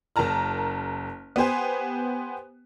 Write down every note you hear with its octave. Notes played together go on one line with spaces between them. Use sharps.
F#1 A#4 A5 A#5 F6
B3 G4 C5 G#5